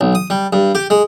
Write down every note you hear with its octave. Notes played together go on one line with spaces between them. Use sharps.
B1
D#6
G3
G2
G4
G#3